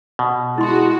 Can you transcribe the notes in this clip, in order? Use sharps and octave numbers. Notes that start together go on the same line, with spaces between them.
B2
G#3 E4 F#4 C6